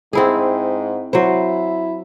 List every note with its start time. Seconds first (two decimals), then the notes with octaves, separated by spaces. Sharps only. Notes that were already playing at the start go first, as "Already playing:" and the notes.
0.13 G#2 C4 E4 G#4
1.13 F#3 E4 C5